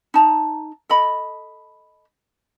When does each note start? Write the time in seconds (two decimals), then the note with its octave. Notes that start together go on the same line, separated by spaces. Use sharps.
0.14 D#4 A5 A#5
0.89 A4 D#5 B5